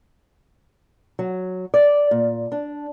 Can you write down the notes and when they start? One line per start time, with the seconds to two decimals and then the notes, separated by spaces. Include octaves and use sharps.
1.19 F#3
1.74 D5
2.11 A#2
2.52 D4